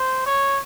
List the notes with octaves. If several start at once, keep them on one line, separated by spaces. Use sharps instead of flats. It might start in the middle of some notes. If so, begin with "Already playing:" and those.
Already playing: C5
C#5